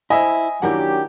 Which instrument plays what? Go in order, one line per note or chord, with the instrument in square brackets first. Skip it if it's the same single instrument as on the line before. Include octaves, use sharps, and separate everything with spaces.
[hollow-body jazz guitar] E4 C5 [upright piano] D#5 E5 [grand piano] G#5
[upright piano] D#3 A#3 [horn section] F#3 D4 G4 [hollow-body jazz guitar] E4 A#4 F#5